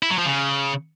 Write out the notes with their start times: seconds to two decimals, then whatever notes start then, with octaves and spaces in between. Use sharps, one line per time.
0.03 E4
0.10 F#3
0.18 F3
0.26 C#3